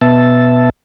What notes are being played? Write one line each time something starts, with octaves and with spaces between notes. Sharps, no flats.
B2 B3 E5 A5